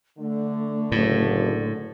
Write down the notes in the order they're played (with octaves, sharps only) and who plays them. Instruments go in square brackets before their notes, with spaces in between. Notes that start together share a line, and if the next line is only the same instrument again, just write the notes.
[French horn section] D3 [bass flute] A3
[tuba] F#1 [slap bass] A2